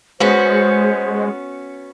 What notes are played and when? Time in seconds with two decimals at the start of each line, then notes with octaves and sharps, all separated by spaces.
0.20 G#3 B3 C#4 F#4 C5